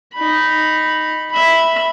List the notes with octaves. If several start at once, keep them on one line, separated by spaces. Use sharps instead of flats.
D#4 B5
E5 B5